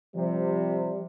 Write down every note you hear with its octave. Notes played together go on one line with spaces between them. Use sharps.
C3 F3 G3